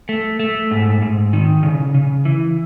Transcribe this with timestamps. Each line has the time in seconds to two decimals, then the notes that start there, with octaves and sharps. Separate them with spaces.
0.09 A3
0.40 A3
0.71 G#2
1.02 G#2
1.33 D#3
1.63 C#3
1.94 C#3
2.25 E3